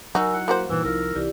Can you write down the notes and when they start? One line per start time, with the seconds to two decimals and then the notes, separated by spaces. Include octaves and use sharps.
0.15 F#3 D#4 F#4 A#4 G#5 E6
0.33 E4 F#5
0.48 A#3 F#4 C5
0.69 G2 A#2 E3 D#4 E4 E6
0.84 C2 E3 F3 A#4
1.15 C2 E3 E4 G4 D5